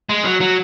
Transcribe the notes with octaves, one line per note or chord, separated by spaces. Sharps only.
G#3
F#3
F#3